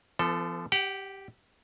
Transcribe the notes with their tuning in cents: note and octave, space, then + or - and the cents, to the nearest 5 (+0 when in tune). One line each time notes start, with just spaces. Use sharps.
F3 -35 B3 +40 A4 +0
G4 +0 F#5 +40